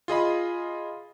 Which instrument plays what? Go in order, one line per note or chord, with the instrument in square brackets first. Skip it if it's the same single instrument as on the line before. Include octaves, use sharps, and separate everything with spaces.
[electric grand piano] F4 G#4 D#5 B5